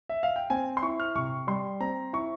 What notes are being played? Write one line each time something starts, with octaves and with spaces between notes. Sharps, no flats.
E5
F5
G5
C4 G#5
C6
E4 C#6
F6
C3 C#6
G3 C6
C4 A#5
E4 C#6